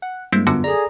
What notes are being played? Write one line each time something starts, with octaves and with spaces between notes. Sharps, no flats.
F#5
G2 G#3 A#3 C4 E4
F#2 D3 B3 F4 F#4
G#4 A4 D5 A#5